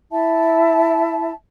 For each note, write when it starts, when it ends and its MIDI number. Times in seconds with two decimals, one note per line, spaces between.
0.11 1.31 64
0.11 1.31 76
0.11 1.31 81